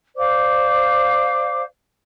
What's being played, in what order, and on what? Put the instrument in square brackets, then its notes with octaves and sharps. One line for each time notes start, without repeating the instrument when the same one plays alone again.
[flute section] C5 D5 F5 D6